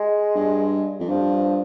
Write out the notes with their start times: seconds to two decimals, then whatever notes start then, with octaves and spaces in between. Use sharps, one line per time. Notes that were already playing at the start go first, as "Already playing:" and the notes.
Already playing: G#3
0.35 G2
1.00 F2
1.09 G2 F3